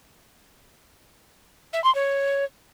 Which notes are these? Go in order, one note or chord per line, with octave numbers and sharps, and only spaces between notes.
E5
C6
C#5